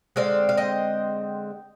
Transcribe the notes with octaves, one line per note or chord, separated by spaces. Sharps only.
D3 G#3 C4 D5 F5
F5
D#5 G5